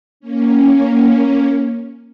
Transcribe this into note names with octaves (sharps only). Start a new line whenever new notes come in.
A#3 C#4